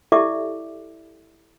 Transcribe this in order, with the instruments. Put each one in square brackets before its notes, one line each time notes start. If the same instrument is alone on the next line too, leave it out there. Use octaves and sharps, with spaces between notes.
[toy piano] E4 G4 A4 D5 E5 D6